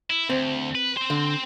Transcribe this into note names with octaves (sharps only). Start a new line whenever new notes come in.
E4
D2 C4
B4
C4 C5
D3